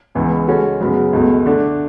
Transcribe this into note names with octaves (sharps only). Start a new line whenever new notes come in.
C#2 C#3 E3 G#3 B3
C#3 G#3 C#4 F#4 A4
F#2 C#3 F#3 B3
C#2 B2 A3
D3 A3 D4